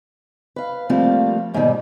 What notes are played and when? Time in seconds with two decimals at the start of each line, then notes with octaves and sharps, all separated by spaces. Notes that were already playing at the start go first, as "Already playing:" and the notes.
0.56 B4 F5
0.90 F3 G3 A3 A#3 C4 F4
1.54 D#2 G#2 B2 D3 D#3 G3